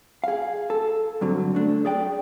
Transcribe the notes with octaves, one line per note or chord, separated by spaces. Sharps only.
G#4 F5
A4
G2 D3 F#3 C4
A3 D4
G#4 D5 G5